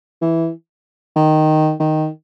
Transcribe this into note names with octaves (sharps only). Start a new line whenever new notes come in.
E3
D#3
D#3